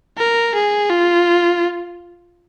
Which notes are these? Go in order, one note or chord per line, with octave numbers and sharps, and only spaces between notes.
A#4
G#4
F4